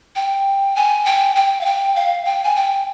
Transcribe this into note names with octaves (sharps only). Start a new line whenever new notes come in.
G5
G#5
G5
G5
F5
G5
F5
G5
G#5
G5